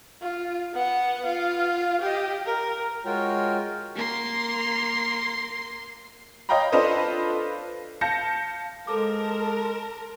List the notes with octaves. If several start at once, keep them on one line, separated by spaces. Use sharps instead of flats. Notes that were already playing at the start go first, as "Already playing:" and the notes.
F4
B3 F#5
F4 F5
G4 D#5
A#4
G#3 F4 F#4 A#4 C#5 G5
A#3 C6
C#5 D#5 F5 G5 A#5 B5
D4 F4 A4 B4 C5 D#5
F5 A5 G6 A#6 C#7
G#3 A4 A#4 C5 A5 D6